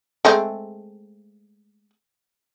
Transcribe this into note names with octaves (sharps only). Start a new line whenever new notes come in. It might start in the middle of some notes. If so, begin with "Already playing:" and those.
G#3 A3 C4